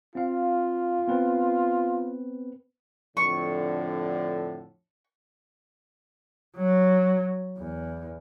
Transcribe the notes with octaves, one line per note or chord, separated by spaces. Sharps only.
C4 F4 F5
B3 C4 B4
F2 A2 D3 C#6
F#3
E2